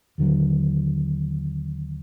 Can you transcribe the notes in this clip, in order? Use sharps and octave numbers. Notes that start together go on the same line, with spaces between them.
D#2 D3 F#3